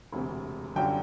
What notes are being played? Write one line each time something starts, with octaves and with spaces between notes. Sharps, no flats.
E1 D2 C3
G1 F#2 D3 G3 G5